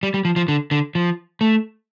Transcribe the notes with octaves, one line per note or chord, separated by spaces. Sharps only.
G3
G3
F3
F3
D3
D3
F3
A3